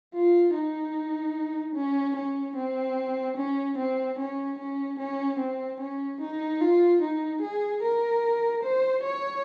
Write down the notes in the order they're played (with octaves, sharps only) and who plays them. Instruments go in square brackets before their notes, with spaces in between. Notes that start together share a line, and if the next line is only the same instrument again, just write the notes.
[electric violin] F4
D#4
C#4
C#4
C4
C#4
C4
C#4
C#4
C#4
C4
C#4
D#4
F4
D#4
G#4
A#4
C5
C#5